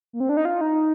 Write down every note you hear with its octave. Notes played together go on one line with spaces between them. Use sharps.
A#3
C4
D4
D#4
F4
D#4